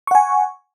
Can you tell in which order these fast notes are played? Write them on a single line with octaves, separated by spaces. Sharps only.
C#6 F#5 G#5